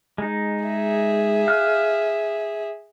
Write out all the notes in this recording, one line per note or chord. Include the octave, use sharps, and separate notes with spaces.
G#3 D#4
G#4 E5
F5 F6 F#6